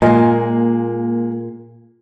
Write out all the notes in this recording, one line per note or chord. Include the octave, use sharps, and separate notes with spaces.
A#2 G#3 A#3 F4 D#5 G#5